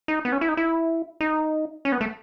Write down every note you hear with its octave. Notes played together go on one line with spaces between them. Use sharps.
D#4
B3
C#4
E4
D#4
E4
D#4
C#4
B3
A3